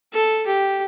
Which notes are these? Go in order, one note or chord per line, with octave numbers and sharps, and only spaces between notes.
A4
G4